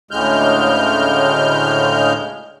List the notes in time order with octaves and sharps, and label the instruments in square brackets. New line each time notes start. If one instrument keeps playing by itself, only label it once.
[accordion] D2 A2 C#3 G#3 F6 G6